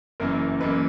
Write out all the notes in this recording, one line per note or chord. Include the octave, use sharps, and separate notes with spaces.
F#1 F#2 E3 A#3 A#4
F#1 F#2 E3 A#3 B4